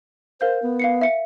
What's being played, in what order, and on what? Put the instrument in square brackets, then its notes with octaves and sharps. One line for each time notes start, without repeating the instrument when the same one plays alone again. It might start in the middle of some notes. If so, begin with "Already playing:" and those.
[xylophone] A#4 F5 G6 [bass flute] C5
[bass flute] B3
[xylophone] F5 C7 C#7
E5 C#7